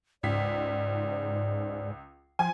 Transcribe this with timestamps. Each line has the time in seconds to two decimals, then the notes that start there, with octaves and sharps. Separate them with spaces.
0.23 C#2 G#2 D5 B6
2.39 F3 G#5